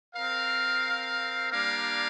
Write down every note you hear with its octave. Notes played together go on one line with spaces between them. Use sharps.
C4 A#4 F5
G3 A#3 D4 A#4 F5